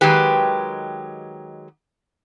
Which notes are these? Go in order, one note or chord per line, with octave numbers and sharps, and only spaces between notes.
D#3 F#3 G#3 G4 B4